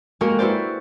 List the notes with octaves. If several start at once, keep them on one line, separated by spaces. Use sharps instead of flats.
G#3 A#3 F#4 G4 A#4
E4 F#4 B4 C5 D5